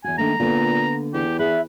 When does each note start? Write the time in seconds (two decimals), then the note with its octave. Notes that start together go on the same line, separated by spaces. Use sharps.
0.04 E2 F#4 G#5
0.18 D#3 A3 A#3 D4 A#5
0.40 A#2 D3 A#3 B3
1.13 E2 G4
1.39 G#4 B4 E5